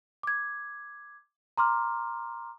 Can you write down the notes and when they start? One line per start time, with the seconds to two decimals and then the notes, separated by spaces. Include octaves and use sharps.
0.23 D6 G#6
1.57 A#5 C6 D6 F6